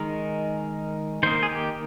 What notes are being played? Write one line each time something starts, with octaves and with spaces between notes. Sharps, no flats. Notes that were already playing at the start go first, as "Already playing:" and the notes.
Already playing: D#3 G#3 D#4 A#4
D#3 A#3 D#4 C5
G#4
G4